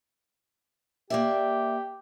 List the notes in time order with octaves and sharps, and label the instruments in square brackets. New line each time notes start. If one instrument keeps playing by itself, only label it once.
[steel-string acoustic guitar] A#3 D5 E5 [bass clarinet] G4